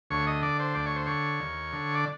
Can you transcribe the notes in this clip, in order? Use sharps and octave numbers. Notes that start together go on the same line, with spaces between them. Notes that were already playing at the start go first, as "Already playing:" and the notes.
D2 C#5
D#5
D3 D5
C5
D2 D5
C#5
C5
D3 C#5
D#2
D3
D5